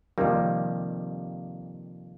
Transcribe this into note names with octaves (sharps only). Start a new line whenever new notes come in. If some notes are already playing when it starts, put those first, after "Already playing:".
F2 C3 D#3 G3 A#3